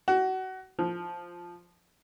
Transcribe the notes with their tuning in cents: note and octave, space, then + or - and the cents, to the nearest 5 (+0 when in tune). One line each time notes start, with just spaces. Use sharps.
F#4 +25
F3 +0